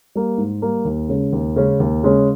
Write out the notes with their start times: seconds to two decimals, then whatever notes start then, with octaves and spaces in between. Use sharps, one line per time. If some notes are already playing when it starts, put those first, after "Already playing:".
0.15 G3 A#3
0.38 G#2
0.62 G3 A#3
0.85 D#2
1.09 C#3 G#3 C#4
1.33 D#2
1.56 C#3 G#3 C#4
1.80 D#2
2.03 C#3 G#3 C#4